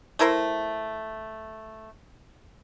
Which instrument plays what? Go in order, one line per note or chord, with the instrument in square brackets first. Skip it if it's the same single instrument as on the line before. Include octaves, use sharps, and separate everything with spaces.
[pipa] A3 E4 A#4 C5